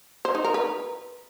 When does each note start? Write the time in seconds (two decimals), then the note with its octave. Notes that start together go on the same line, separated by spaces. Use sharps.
0.25 C5
0.35 D#4
0.44 A#4
0.54 B4